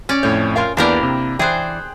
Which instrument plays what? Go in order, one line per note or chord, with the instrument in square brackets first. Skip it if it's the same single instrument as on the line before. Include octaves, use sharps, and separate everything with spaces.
[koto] C#4 D5
[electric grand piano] F2 A2 G6 [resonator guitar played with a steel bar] C#5
[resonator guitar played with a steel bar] F4 A#4 F5
[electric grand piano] E2 B4 D5 [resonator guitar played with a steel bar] A#3 E4 [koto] D4 G4 A#4
[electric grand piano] C3
[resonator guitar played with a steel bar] E3 D5 [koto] G#4 C5 [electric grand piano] G5 F#6